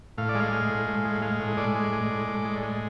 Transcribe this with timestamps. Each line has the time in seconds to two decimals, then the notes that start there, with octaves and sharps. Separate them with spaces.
0.18 A2 F5
0.29 D5
0.35 G#3 F5
0.52 G#3
0.70 A2
0.88 A2
1.05 G#3
1.22 G#3
1.40 A2
1.57 A2 D5
1.75 G#3
1.92 G#3
2.10 A2
2.27 A2
2.45 G#3
2.63 G#3